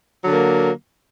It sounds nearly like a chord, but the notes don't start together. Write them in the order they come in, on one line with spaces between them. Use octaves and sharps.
F#3 D3 A#3